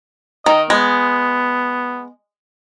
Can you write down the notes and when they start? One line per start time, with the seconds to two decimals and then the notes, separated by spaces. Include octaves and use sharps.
0.46 D#3 D#5
0.70 G#3 B3